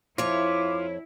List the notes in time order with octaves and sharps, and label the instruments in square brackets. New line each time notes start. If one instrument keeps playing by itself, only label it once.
[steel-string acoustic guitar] F2 C#5 [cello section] E4 [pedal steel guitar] F4 [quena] D6